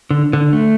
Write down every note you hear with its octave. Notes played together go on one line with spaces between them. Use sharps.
D3
D3
A3